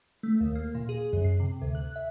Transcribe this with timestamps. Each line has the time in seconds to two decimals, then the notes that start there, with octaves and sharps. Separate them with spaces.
0.23 A3
0.41 D#2
0.55 A#3
0.75 A#2
0.89 G#4
1.13 F#2
1.24 C7
1.40 C3
1.62 D2
1.75 F#6
1.96 E5